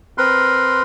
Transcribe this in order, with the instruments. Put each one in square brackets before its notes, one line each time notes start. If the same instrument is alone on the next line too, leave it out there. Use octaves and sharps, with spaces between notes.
[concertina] C4 A#4 B4 C6